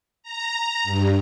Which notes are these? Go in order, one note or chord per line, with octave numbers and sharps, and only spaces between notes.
A#5
G2